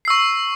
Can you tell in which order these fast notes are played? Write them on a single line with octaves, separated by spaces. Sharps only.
C7 E6 C#6